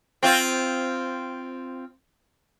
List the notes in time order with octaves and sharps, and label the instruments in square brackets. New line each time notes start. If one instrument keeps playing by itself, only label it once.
[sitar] C4 F4